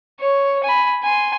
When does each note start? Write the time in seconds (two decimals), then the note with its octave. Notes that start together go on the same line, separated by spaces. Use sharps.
0.20 C#5
0.64 G#5 B5
1.04 G#5 C6